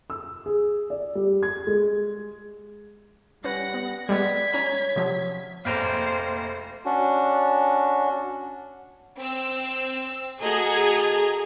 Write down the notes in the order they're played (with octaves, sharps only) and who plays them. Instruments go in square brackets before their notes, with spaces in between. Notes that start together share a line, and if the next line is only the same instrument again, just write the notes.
[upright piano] E6
G#4
D5
G3
G#6
G#3
[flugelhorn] G3 [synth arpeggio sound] C#4 B4 [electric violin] F#5 A#6
[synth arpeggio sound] B3
[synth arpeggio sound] G3 G#3 B3 [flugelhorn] D5 [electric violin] G#6 B6
[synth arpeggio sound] C#4 A#5 D#7 [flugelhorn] C#5
[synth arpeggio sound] C3 F3 F#3
[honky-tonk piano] F1 A#1 [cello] C5 [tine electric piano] F5 G5 A#5
[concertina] C#4 D4 F#4
[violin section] C4 E6
[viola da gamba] A3 F#4 D#5 [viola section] G#4 [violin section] A4 A#5 G#6